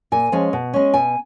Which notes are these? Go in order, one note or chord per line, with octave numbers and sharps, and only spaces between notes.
A#2 G#5
F3 G#3 C#4
B2
G#3 C#4
B2 G#5